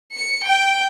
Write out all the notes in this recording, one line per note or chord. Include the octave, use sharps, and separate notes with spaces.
C#7
G5